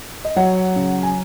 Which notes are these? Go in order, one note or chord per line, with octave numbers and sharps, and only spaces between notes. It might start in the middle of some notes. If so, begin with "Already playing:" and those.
D#5
F#3 C#5 F#5
C#3
G#5